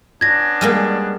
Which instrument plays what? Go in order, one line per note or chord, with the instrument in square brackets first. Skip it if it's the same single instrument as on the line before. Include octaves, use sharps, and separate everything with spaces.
[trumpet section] B3 C#4 D4 [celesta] G#6 A#6
[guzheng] G3 G#3 A#3